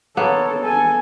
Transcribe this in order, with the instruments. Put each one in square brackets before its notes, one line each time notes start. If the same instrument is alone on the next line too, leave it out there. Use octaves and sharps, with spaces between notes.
[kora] A#3 B3 [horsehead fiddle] A4 C#5
[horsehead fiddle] A4 G#5